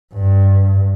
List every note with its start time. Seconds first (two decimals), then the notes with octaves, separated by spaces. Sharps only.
0.14 G2